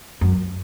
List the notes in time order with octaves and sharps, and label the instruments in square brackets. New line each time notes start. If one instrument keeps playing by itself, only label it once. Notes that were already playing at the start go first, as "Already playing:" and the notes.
[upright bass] F#2